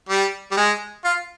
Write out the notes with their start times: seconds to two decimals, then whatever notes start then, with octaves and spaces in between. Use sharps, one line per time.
0.09 G3
0.52 G3
0.57 G#3
1.05 F4